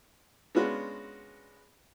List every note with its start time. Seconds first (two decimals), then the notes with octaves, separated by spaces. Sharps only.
0.55 G#3 B3 C#4 D4 F4 F#4